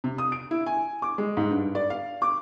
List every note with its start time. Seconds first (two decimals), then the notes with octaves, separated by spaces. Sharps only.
0.04 C3
0.18 D#6
0.32 D7
0.51 E4
0.66 G#5
1.02 D6
1.18 G#3
1.37 G#2
1.51 G2
1.75 D5
1.90 F5
2.22 D6